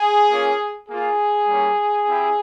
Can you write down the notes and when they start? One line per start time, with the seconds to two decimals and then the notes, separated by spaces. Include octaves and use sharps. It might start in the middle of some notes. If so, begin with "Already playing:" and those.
Already playing: G#4
0.30 A#3 C#4 F4
0.88 A#3 F4 G#4
1.48 G3 A#3 C#4
2.07 C4 E4 G4